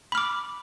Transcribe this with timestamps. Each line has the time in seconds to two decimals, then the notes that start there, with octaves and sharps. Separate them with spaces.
0.12 B5
0.15 F6
0.18 D6